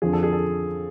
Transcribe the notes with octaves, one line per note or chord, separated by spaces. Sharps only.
F2 D3 F3 G#4
A4
G#4
A4